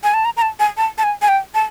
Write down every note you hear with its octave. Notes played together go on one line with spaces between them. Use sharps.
G#5
A5
A#5
A#5
A5
G#5
A5
A5
G#5
G#5
G5
A5